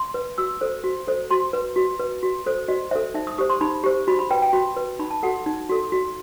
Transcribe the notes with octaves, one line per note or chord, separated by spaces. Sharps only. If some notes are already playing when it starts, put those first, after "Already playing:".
Already playing: C6
B4
F#4 E6
A4 C5
F#4
A4 C5
F#4 C6
B4
F#4
B4
F#4
A4 C5
F#4 D#5
A4 C5 E5
D#4 E5
D#6
G4 C5 D#6
C6
D#4 B5
G4 C5
F#4 B5
B5
B4 G5
G5
F#4 B5
B4
D#4 B5
A5
F#4 A4 F#5
D#4
F#4 A4
F#4